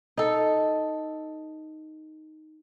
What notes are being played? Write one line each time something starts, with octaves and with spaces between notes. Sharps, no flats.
D#4 A4